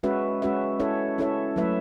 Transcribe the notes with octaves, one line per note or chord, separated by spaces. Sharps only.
G#3 C#4 F#4 B4 E5
G#3 C#4 F#4 B4 E5
C#4 E4 A4 C#5 E5
C#4 E4 A4 C#5 E5
F#3 A3 E4 B4 E5